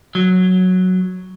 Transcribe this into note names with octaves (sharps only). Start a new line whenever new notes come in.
F#3